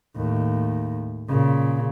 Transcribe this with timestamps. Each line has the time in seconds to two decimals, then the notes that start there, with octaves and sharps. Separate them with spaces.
0.16 D#2 A2
1.29 A#2 C#3